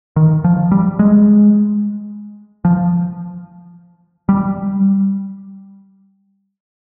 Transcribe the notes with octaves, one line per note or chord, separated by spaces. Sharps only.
D#3
F3
G3
G#3
F3
G3